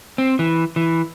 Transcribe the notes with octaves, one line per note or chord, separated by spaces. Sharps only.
C4
E3
E3